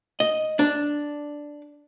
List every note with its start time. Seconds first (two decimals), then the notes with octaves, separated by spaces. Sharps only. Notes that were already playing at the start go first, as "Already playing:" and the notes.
0.20 D#5
0.59 D4